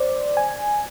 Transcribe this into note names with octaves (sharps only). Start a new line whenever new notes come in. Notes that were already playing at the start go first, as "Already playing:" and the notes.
Already playing: C5 D5
G#5